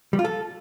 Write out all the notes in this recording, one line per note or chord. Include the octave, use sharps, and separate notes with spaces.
G3
F4
A4